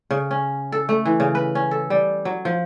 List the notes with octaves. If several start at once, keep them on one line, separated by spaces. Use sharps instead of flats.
C#3
C#4
A4
A3
E3
C#3
B4
C#4
A4
G3
F#3
F3